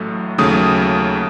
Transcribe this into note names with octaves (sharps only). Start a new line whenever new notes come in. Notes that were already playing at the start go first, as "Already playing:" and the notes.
Already playing: A1 A2 F#3 A3
D#2 C#3 F#3 A3 D#6